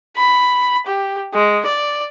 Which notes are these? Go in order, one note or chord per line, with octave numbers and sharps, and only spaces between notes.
B5
G4
G#3
D5